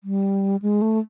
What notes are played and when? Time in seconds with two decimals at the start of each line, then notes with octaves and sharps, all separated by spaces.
0.04 G3
0.62 G#3
0.82 A3